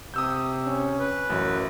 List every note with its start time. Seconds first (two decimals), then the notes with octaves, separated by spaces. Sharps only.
0.14 C3 D#6 E6 G6
0.67 C#4
0.99 B4
1.30 A1 F#2